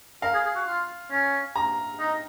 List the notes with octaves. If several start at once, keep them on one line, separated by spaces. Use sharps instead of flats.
A#4 F5
G#4
G#4
F#4
F4
C#4
A#5
D#4